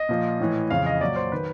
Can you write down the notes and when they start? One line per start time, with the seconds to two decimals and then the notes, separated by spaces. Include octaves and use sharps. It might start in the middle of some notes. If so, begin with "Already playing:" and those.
Already playing: D#5
0.09 A#2 F3
0.40 A2 E3
0.70 F2 C#3 E3 F5
0.86 D#5
1.01 A#2 F#3 D5
1.16 C5
1.32 D#3 F#3 B4